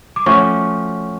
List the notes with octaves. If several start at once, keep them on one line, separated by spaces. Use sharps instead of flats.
D6
F3 A3 C#4 F#4 C#5 C#6